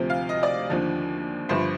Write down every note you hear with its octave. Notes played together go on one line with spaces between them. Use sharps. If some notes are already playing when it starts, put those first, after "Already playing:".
Already playing: D2 C3 F3
F5
D#5
D5
D#2 D3 F3
G1 G2 F3 C5